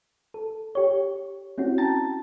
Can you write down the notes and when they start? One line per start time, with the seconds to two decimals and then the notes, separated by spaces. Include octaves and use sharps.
0.34 A4
0.75 G4 C#5
1.58 C4 C#4 E4 F#4
1.78 G5 A5 A#5 A6